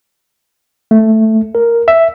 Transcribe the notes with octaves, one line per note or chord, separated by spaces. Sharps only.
A3
A#4
E5